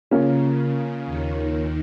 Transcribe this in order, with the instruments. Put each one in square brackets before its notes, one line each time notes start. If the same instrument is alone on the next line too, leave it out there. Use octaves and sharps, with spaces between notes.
[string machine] C#3 [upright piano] A#3 C#4 F4 A#4
[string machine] D#2 D#3